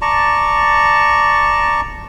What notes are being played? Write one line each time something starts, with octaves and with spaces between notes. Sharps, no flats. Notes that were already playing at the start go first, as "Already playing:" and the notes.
D5 A5 A#5 C#6